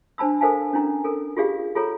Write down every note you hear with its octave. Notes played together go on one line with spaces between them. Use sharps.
D4 C5 A5 B5 E6
A4 A#4 C5 F5 G#5 A5
C#4 D4 E4 A#5
A4 A#4
F4 G4 G#4 D5 F5
F4 G#4 A4 C#5 A#5